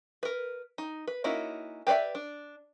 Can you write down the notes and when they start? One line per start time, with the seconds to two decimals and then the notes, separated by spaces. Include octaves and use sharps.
0.23 A#4 B4
0.78 D#4
1.07 B4
1.24 A#3 C#4 D#4 E4 F#4
1.87 G4 B4 C#5 D5 E5
2.15 D4